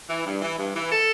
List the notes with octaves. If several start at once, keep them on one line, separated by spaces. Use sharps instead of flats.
E3
G2
E3
G2
E3
A4